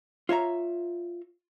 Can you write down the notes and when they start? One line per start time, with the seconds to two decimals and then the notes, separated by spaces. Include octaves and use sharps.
0.29 F4 C#5 E5 A#5